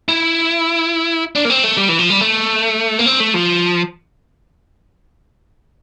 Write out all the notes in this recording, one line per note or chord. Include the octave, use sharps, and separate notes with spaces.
E4
D4
A#3
C4
A3
G3
E3
F3
G3
A3
A#3
C4
A3
F3